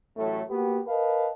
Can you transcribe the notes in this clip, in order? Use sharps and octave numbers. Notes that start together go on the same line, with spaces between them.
A1 A2 F#3 A3 A4
A#3 B3 F#4 G4
A#4 B4 D#5 F5 A5